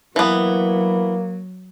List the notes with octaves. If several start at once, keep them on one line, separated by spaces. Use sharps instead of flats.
E3 F#3 A#3 B3